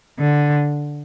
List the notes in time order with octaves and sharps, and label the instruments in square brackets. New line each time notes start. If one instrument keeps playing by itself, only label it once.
[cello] D3